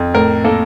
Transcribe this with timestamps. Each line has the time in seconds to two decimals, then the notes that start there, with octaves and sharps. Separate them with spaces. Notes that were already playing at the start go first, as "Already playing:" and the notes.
Already playing: F2
0.14 A2 A#4
0.44 A#3 A4